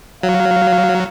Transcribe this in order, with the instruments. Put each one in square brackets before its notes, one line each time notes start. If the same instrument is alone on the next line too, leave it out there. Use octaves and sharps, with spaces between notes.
[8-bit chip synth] F#3 [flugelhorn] F5